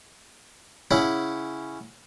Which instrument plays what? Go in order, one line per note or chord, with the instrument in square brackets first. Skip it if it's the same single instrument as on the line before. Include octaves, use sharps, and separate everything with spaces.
[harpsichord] C#3 C#4 E4 F#5